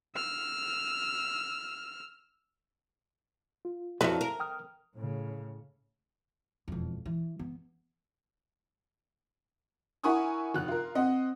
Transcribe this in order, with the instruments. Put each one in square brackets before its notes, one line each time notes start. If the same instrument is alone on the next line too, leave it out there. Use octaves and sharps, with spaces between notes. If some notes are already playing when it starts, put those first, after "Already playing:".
[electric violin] E6 F6
[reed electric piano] F4
[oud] F2 F#3 [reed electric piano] E4 D5 [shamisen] B4 E5
[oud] A#4
[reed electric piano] G5 D#6 F6
[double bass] A2 C#3
[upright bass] E1 F2
E3
B3
[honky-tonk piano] E4 A#4 F#5 G#5 C#6 D#6
F1 F#6
F4 A#4
C4 D#5 F#5